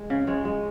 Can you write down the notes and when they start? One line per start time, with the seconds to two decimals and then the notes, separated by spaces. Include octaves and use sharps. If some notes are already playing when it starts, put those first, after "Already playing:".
Already playing: G#3 G#4
0.10 C#3
0.27 G#3 C#5
0.45 G#3